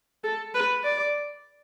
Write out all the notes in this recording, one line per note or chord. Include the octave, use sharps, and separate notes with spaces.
A4
B4
D5